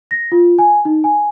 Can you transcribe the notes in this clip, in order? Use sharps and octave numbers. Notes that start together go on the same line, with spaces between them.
A#6
F4
G#5
D#4
G#5